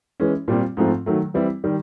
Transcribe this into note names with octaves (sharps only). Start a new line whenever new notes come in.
E3 G#3 C#4
A#2 G3 C4 F4
G#2 F3 A3 C4 F4
D#3 F#3 A3
E3 G3 C4 E4
D#3 G3